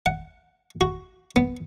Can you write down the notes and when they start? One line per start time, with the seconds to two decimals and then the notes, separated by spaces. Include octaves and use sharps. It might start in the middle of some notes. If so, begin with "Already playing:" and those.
0.06 F#5
0.81 F#4
1.36 B3